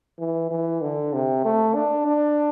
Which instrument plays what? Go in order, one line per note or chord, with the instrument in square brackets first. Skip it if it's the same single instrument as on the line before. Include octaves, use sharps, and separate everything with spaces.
[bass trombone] E3
E3
D3
C3
A3
D4
D4